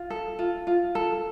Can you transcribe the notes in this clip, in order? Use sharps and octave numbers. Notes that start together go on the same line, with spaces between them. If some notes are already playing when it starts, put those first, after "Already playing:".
Already playing: F4
A4
F4
F4
A4